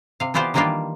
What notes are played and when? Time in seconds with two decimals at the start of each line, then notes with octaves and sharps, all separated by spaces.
0.20 C3 F5
0.34 E3 B3 F4 G4 C5 D5
0.54 D#3 E3 G3 A#3 D4 F4